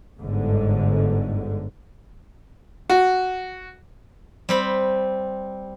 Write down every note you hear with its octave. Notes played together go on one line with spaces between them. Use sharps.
G1 G#2 D3
F#4
G3 C4 B5